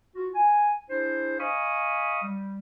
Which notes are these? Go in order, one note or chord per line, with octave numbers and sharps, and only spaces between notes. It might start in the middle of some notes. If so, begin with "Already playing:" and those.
F4 F#4
G#5
D4 E4 G#4 C5
D#5 F5 G#5 B5 C#6 D#6
G3